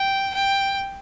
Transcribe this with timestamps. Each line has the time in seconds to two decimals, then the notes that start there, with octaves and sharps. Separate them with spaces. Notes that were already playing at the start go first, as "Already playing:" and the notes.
Already playing: G5
0.34 G5